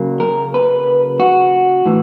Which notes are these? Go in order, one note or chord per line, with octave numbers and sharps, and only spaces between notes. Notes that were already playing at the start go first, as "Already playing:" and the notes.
Already playing: C#3 F#3 A#3
A#4
B4
F#4
A2 E3